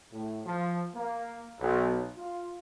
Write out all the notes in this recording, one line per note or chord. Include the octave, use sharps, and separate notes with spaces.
A2
F3
A#3
B1
F4